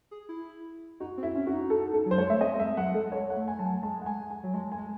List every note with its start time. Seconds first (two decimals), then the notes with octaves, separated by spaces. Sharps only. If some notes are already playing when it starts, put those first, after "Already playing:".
0.11 G#4
0.29 E4
1.00 D#4 F#4
1.17 C4
1.23 E4
1.35 C#4
1.47 F#4
1.53 D#4
1.70 A4
1.94 A4
2.06 F#3
2.11 C5
2.18 G#3 C#5
2.30 A3 E5
2.41 C4 D#5
2.59 G#3 E5
2.77 F#3 F#5
2.94 G#3 A4
3.12 G#3 C#5
3.30 F#5
3.36 A3
3.48 G#5
3.59 F#3 A5
3.66 G#5
3.83 G#3 A5
4.02 F#5
4.06 G#5
4.30 G#5
4.43 F#3
4.54 G#3 A5
4.72 G#5
4.77 G#3